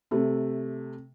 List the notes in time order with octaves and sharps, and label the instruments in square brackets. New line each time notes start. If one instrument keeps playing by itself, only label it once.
[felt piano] C3 A3